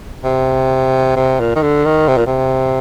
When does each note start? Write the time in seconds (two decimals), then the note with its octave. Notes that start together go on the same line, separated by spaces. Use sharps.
0.24 C3
1.16 C3
1.40 A#2
1.55 D#3
1.62 D3
1.85 D#3
2.08 C3
2.17 A#2
2.26 C3